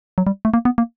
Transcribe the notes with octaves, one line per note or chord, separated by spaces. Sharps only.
F#3
G3
A3
A#3
B3
A#3